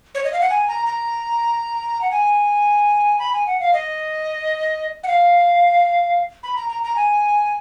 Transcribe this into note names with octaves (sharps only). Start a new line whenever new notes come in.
C#5
D#5
F5
F#5
G#5
A#5
A#5
F#5
G#5
B5
G#5
F#5
F5
D#5
F#5
F5
B5
A#5
A#5
A#5
G#5